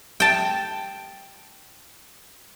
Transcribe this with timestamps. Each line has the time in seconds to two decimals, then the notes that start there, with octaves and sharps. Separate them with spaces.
0.20 G5 A5